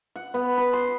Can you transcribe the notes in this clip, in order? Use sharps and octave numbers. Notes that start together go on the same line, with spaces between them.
F#5
B3
B4
C6